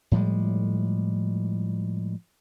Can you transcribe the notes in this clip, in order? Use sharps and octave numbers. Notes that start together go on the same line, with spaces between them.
A2 F3 G3 G#3